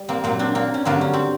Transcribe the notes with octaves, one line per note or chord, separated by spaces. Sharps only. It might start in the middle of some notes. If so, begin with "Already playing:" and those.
Already playing: G3
A#3 C4
A#2 F#3 A#3 C4
C4 D4
A#3 C4
C#4
G2 D3 F#3 A#3 C4
C#4
C4